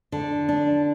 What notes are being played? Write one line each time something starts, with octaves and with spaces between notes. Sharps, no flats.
D3
D4